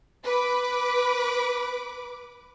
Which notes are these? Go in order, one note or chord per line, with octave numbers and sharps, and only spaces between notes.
B4 D6